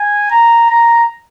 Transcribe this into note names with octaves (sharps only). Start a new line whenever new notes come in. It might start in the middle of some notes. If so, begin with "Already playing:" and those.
Already playing: G#5
A#5
A#5